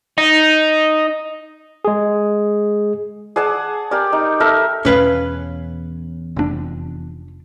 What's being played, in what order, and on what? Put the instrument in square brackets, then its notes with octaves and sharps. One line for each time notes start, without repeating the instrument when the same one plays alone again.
[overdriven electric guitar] D#4
[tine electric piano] G#3 G#4
[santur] G#4 D5 F#5 A5
G4 A#4 D5
D#4
A4 A#4 E5
[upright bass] E2 B2 [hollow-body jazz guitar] C#4 B4 F5
[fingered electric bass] F1 G#2 D4